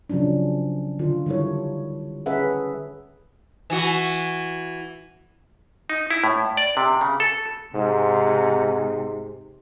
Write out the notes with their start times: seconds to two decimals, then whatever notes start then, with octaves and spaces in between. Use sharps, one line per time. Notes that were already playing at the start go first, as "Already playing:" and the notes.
0.10 C#3 F3 F#3 C#4 D4
0.99 D3 F4
1.26 D#3 G3 E4 A4 C#5
2.26 C#4 G#4 A4 B4 E5 F#5
3.70 E3 F#4
5.90 D#4
6.11 E4
6.24 A2
6.57 D5
6.77 C3
7.01 C#3
7.20 A4
7.75 G#2 C3